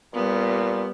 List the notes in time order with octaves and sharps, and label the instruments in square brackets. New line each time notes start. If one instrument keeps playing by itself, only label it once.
[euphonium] A#2 [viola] G3 B3